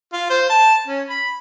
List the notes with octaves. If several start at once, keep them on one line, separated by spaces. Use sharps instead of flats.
F4
C5
A5
C#4
B5